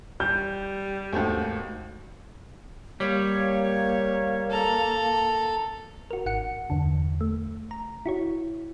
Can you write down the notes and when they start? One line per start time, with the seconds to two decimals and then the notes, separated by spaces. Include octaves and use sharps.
0.20 G3 G6
1.13 G#1 D#2 A3 F#4 G5
3.00 G3 A#3 C#5
4.51 A4 A#5
6.11 F#4 A#4
6.26 G#1 F#5 C#7
6.70 E2 G2 D3
7.21 A3
7.71 A#5
8.06 E4 F#4 C#5